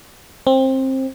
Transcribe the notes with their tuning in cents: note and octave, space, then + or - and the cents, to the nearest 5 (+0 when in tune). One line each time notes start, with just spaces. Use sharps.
C4 +20